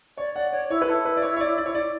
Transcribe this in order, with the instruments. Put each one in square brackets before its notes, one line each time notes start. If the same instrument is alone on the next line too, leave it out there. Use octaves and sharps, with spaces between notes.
[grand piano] C#5 [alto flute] D5
[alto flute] D5 [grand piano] F#5
[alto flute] C#5 [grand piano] D5
[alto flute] E4 [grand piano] C#5
[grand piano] B4
[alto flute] E4 [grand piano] A4
[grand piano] B4
D5
C#5
C#5
D5
D5
C#5
D5